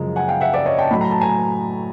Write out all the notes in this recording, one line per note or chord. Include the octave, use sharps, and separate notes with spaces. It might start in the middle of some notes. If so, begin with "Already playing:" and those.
Already playing: F#2 C#3 F3 G#3
F#5 G#5
F5 G5
E5 F#5
D5 E5
C#5 D#5
G5 A5
A2 F#3 A3 B5
A#5
A5
G#5 A#5